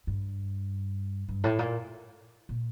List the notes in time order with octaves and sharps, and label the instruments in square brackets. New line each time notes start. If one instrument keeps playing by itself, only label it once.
[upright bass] G2
G2
A2
A#2
A#2